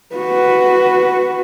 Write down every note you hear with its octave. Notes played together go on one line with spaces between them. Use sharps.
F#4 B4